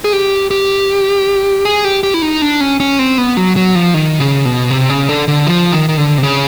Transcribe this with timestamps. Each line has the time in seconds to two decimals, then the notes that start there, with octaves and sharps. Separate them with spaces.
0.04 G#4
0.13 G4
0.51 G4
1.65 G#4
1.84 G4
2.03 G4
2.14 E4
2.22 D#4
2.42 D4
2.61 C#4
2.80 C#4
2.99 C4
3.18 B3
3.37 F#3
3.56 F#3
3.75 F3
3.94 D#3
4.20 C#3
4.45 B2
4.70 C3
4.89 C#3
5.09 D3
5.28 D3
5.47 F3
5.72 D#3
5.89 D#3
5.98 D3
6.18 C3
6.23 C#3